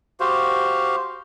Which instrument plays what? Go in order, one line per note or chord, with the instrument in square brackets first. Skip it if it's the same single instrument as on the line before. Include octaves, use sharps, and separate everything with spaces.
[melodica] F#4 G4 C5 F5